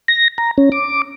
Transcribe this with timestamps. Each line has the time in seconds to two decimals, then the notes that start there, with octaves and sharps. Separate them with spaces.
0.08 A#6
0.38 A#5
0.58 C#4
0.72 D6